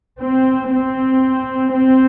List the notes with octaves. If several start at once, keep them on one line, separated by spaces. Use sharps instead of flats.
C4
C4
C4